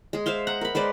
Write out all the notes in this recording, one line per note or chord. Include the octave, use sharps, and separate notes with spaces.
G#3 G#4
C5 E5 F5 C6
F#5 A#5
A#4 B5
G#3 B4 C5 D5